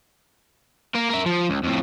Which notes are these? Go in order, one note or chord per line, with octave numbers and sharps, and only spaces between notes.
A#3 A#4
A#4 E5
F3
C#2
F2 A2